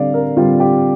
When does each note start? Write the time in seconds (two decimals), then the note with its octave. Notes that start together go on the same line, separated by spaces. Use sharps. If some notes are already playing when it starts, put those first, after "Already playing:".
Already playing: D3 G3 C4 D5 F5
0.14 A#4
0.36 D3 G3 C4 F4
0.60 G4